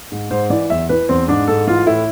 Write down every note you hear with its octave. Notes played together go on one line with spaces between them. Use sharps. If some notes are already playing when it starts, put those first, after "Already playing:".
G#2
G#2 C5
E3 D5
E2 E5
E3 B4
E2 C4
G#2 D4
G#2 A4
E3 F4
A2 E4